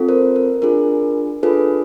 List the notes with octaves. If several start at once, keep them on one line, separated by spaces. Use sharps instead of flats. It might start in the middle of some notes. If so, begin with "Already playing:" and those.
Already playing: C4 F4 A4
A#4 C5
A#4
D4 F4 G#4 A#4
D4 F4 G#4 A4 B4